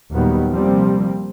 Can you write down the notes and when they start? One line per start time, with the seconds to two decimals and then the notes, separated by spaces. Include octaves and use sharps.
0.12 D#2 A#2 D#3 F#3 G3 B3
0.53 C3 F3 G3 A#3 C4